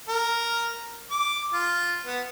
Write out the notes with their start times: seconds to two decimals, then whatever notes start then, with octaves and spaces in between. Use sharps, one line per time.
0.08 A#4
1.11 D6
1.52 F4
2.05 B3